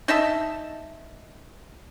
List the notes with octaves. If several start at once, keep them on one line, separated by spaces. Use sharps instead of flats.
D#4 D#5 E5 A5